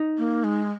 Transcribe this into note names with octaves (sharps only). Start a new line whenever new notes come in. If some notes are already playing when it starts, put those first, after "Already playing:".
Already playing: D#4
A#3
G#3